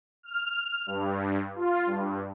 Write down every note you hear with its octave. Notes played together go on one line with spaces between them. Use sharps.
F6
G2
F4
G2